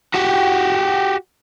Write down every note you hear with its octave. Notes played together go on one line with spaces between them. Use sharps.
F#4 G4